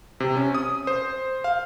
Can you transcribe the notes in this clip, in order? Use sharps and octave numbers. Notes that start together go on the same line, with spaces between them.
C3
C#4
D#6
C5
F5